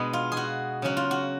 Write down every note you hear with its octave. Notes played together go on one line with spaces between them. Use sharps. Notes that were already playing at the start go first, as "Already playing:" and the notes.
Already playing: B2 G#3 B3 D4
F4
G#4
F#4
C#3 F#3 C#4 F#4
F4
F#4